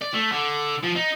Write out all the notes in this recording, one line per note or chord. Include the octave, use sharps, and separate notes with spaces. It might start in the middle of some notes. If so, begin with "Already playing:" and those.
D5
A3
D3
F3
D#4